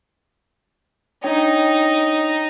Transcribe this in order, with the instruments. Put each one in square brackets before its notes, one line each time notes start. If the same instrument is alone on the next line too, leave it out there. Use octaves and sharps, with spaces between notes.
[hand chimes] D4 C#5 G5 [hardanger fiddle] D#4